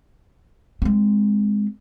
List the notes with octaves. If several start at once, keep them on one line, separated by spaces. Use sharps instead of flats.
G#3 C4